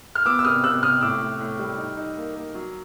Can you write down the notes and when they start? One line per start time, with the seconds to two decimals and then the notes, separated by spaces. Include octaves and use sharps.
0.15 F6
0.26 B3 D6 E6
0.39 E6
0.45 C3 D#6 F6
0.64 C3 E6 F#6
0.83 C3 D#6 F6
1.01 A2 D6 E6
1.21 A2
1.41 A2
1.59 G3
1.78 D#4
1.97 D#4
2.17 A#3
2.35 A#3
2.54 F#3